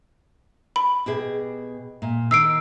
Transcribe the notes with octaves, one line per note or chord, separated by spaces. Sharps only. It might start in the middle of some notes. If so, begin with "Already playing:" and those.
B5
B2 G4 G#4
A#2
D#3 E6 C7 D7